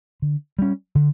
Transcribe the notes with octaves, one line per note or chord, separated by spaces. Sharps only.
D3
G3 C#4
D3